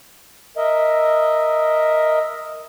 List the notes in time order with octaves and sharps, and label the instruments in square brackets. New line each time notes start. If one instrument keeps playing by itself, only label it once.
[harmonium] A#4 D#5 E5